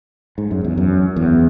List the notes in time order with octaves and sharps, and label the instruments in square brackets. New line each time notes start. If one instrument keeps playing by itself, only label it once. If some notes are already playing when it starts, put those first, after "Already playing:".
[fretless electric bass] G#2
F#2
E2
F#2
E2